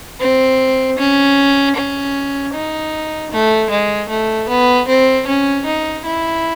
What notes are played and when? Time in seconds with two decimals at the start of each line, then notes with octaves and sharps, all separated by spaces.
0.20 C4
0.98 C#4
1.76 C#4
2.54 D#4
3.31 A3
3.70 G#3
4.09 A3
4.49 B3
4.88 C4
5.27 C#4
5.66 D#4
6.05 E4